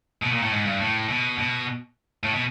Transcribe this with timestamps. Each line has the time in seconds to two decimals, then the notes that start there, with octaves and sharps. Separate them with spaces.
0.22 B2
0.32 A#2
0.42 A2
0.51 G#2
0.65 G2
0.79 A2
1.09 B2
1.38 B2
2.23 A2
2.34 B2